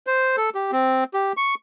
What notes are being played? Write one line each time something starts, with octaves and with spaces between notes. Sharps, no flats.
C5
A4
G4
C4
G4
C#6